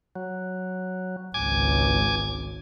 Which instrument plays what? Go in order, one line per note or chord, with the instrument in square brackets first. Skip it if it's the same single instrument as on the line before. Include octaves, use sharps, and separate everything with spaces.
[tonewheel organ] F#3
[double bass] G#1 C#2 [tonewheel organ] G#5 D6 G#6